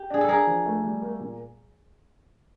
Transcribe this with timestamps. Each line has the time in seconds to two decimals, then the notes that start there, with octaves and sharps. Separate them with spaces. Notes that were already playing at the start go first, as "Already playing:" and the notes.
Already playing: G4
0.10 D4 G#4
0.21 A4
0.28 D4 G#4 A#4
0.47 F3
0.66 A3
0.84 G3
1.02 A#3
1.20 A#2